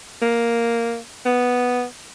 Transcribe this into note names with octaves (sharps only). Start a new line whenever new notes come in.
A#3
B3